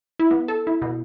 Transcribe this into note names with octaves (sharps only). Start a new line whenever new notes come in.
E4
B3
A4
E4
B2